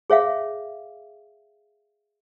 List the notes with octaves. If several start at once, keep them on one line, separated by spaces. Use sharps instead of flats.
G#4 C#5 E5 F5